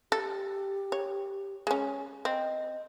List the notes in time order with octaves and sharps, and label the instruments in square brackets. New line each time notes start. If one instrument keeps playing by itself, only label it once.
[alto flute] G4 [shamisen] A4
[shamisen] C#5
G#3 C#4
[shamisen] C4 [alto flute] D#5